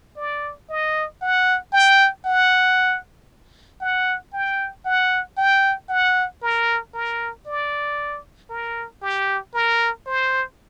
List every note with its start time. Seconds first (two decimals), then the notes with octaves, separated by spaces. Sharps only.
0.16 D5
0.69 D#5
1.21 F#5
1.73 G5
2.25 F#5
3.81 F#5
4.33 G5
4.85 F#5
5.38 G5
5.89 F#5
6.42 A#4
6.94 A#4
7.46 D5
8.50 A#4
9.02 G4
9.54 A#4
10.06 C5